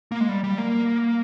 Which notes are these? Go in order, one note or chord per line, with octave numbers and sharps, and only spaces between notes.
A#3
G#3
G3
G3
A#3